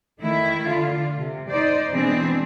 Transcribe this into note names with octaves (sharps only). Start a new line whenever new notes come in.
D#3 A3 E4
D3 F4
C3
D#4 C5 D5
B2 E3 G#3 C4 D4 G#4